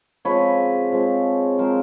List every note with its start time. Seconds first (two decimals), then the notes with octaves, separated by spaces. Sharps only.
0.25 F3 G#3 C4 B4 C#5
0.92 F3 G#3 C4
1.58 F3 G#3 C4 A#4 C5